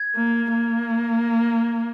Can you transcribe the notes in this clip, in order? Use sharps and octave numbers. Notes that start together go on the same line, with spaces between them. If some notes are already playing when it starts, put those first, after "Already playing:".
Already playing: G#6
A#3
A#3